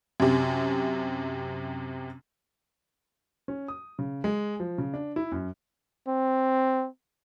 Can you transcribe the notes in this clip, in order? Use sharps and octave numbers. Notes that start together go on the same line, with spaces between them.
F#2 C3
C#4
D#6
C#3
G#3
F3
C#3
D4
E4
F#2
C4